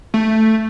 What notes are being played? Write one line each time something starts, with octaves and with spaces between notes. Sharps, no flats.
A3